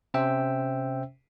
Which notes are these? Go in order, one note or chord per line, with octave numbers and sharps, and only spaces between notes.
C3 C#4 C5 E5 G5 E6